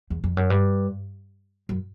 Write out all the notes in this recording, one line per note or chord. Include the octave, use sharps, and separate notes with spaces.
E2
F2
F#2
G2
F#2